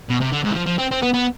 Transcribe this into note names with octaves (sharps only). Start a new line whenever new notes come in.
B2
C3
D3
G#2
E3
F3
F3
C4
C4
B3
B3